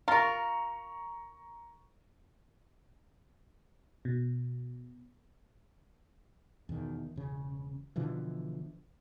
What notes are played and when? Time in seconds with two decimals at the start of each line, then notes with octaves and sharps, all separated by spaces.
0.08 F4 A#4 A#5 C#6
4.05 B2
6.69 E2 B2 D#3
7.16 E1 C#3
7.96 B2 D3 E3 F3